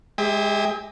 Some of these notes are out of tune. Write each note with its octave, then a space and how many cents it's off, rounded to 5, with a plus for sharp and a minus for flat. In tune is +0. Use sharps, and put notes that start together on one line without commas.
G#3 -5 G4 +30 E5 -40